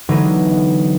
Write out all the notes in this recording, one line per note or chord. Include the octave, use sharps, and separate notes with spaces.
D3 E3 F#3 G#3 B3 D#4